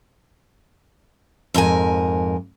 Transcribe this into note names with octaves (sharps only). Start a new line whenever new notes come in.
F2 G#2 A#4 G#5